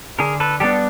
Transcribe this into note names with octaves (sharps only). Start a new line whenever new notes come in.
D3 G#4 A#4
A4 B4
G3 B3 D4 G4 A4